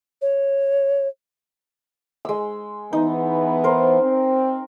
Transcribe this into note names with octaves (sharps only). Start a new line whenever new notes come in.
C#5
G#3 E6
E3 B3 D#4
A#4 C5
C4